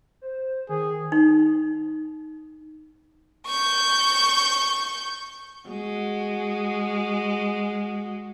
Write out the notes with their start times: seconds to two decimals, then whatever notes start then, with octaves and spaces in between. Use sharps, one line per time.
0.21 C5
0.69 D#3 G#4
1.12 D#4
3.46 C#6 G6
5.68 G#3 F#4